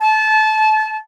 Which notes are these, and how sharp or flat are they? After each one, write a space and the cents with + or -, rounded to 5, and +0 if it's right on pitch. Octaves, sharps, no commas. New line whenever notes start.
A5 -25